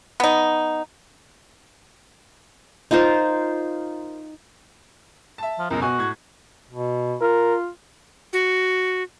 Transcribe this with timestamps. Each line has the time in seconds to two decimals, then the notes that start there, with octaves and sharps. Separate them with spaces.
0.20 B3 D#4
2.91 D#4 F4 A#4 C5
5.38 E5 A5
5.59 F3
5.70 C#2 F#2 B2 A#4
5.82 B2 F#4 G#5
5.98 A2 G#6
6.70 B2
7.21 F4 A#4
8.33 F#4